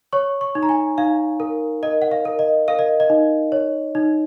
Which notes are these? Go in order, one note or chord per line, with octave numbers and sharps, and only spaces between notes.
C#5 C#6
C#6
D#4
A#5
G#5
D#4 F5
A#4
A#4 D#5
F#5
F5
A#4
D#5
A#4 F5
D#5
D#5
D#4
C#5
D#4